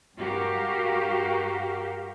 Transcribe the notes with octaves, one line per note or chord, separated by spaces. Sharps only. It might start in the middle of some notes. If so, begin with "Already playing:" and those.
G2 F#4 G4 A#4 F5